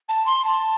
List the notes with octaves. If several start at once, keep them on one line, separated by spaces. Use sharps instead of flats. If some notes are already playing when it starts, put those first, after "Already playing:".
A5
C6
A5